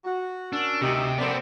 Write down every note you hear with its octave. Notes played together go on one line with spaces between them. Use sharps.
F#4
C#4 D4 A#4 E6
D2 C3 D#4 G4
D3 F3 B3 C4 A#4 C5 D5